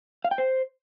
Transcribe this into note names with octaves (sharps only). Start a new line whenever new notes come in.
F5
G5
C5